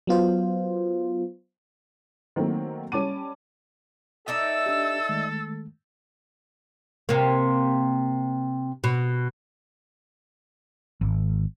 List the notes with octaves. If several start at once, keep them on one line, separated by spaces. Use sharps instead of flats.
F#3 B3 F4 C5
D#3 F#3 A3 A#3 C4
G3 C#4 A5 D6 D#7
D#4 A4 D5 E5 E6
D4 G4
D#3 G#3 A3
C3 A#3
B2
G#1